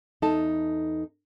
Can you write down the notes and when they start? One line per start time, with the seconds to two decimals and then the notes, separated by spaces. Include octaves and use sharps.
0.22 E2 D#4 A4 A5